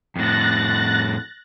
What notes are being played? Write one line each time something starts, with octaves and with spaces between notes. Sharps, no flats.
F2 A2 F#6 A6 A#6